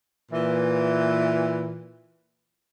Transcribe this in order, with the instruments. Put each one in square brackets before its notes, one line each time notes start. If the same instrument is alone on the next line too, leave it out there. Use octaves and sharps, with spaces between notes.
[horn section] A#2 E3